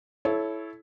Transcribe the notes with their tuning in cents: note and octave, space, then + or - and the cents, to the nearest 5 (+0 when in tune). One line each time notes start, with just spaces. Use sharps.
E4 +0 A4 -25 C#5 +0